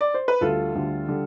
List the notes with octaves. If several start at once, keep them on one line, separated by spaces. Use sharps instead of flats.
D5
C5
B4
D2 D3 G3 F4 A4
D2 D3 G3
D3 G3